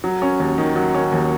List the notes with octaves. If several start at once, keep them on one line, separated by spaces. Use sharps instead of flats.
F#3
C#4
D#2
D#3
F#3
C#4
D#2